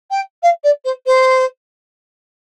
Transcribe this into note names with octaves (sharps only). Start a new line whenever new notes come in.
G5
F5
D5
C5
C5